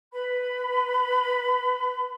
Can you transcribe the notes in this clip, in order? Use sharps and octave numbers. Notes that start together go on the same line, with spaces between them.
B4 B5